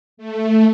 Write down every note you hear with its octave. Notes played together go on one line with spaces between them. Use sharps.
A3